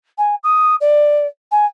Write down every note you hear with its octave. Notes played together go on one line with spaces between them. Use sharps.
G#5
D#6
D5
G#5